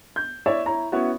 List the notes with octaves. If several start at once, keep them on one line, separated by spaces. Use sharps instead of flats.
G6
E4 C#5 D5 E5
E4 C#5 A#5
B3 C#4 E4 F#4 C#5